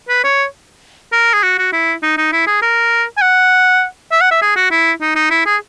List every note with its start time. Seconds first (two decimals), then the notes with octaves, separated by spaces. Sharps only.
0.09 B4
0.24 C#5
1.12 A#4
1.33 G#4
1.43 F#4
1.58 F#4
1.73 E4
2.02 D#4
2.17 D#4
2.32 E4
2.47 G#4
2.62 A#4
3.17 G#5
3.22 F#5
4.12 E5
4.21 F#5
4.31 E5
4.42 G#4
4.56 F#4
4.71 E4
5.01 D#4
5.16 D#4
5.31 E4
5.46 G#4